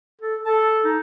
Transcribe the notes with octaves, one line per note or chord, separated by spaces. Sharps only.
A4
A4 A5
D#4